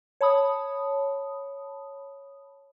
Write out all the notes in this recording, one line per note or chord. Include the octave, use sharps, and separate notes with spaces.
C#5 A5 B5 D#6